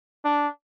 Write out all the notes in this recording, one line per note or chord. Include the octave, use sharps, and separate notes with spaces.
D4